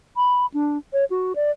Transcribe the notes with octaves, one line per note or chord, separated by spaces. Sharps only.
B5
D4
C#5
F#4
D5